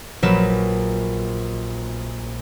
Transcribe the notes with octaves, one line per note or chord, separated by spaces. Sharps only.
A#1 F#3 A#4 B4 E7